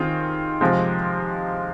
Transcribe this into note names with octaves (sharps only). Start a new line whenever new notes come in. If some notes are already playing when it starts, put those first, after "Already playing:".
Already playing: D#3 C4 F4 G#4
C3 F3 G#3 C4